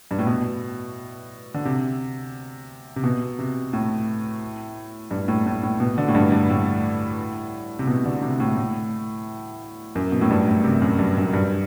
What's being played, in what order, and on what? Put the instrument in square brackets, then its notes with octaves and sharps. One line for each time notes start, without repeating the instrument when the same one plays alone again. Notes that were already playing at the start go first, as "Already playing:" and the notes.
[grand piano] G2
A2
B2
D3
C3
C3
B2
C3
A2
G2
A2
A2
A2
B2
D3
A2
G2
G2
A2
C3
B2
D3
C3
A2
A2
F#2
B2
A2
G2
A2
C3
F#2
G2
F#2
G2